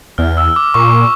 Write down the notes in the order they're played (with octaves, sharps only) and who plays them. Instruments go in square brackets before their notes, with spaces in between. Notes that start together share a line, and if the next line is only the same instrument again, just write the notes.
[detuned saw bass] E2 [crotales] F6
[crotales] E6
D6
[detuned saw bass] A#2 [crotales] C#6